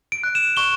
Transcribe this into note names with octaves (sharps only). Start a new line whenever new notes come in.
D7
F#6
E7
C#6 G7